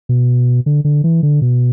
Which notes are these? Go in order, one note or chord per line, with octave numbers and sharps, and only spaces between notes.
B2
D3
D3
E3
D3
B2